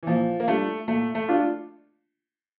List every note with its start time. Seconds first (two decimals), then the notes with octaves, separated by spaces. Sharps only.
0.03 E3
0.07 A#2 F3
0.40 A#3
0.48 G3 A3 D4 F4
0.88 A#2 A3
1.15 A3
1.28 D4 F4